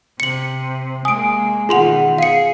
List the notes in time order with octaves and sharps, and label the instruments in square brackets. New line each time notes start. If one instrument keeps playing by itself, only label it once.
[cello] C3 [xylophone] C#7 F#7
[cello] G#3 A#3 [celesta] G#5 D7 [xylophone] D#6
[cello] B2 D#3 [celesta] F4 F#5 [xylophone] G#4 C6 F7
[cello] G#4 [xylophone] F5 C#7